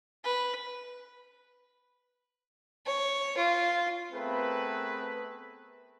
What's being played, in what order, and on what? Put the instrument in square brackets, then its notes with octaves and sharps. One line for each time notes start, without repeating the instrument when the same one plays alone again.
[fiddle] B4
C#5
F4
[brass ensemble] A3 B3 C4 G#4 A#4 B4